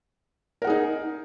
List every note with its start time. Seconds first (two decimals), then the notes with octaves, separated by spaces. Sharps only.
0.62 A#4
0.64 F#5
0.67 G#4
0.70 D#4